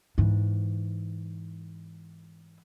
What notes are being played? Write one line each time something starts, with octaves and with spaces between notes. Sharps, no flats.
G#2 E3